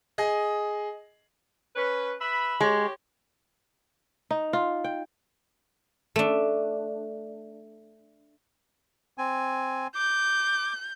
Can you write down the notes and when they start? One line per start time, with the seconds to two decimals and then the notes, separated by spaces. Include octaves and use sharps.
0.18 G#4 D#5
1.75 C#4 B4
2.20 B4 E5 B5
2.61 G#3 G4 C#5
4.31 D#4
4.53 F4
4.84 G5
6.16 A3 D4
9.18 C4 G#5
9.95 D6 G6